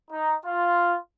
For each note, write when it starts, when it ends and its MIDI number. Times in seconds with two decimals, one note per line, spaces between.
0.11 0.34 63
0.45 0.95 65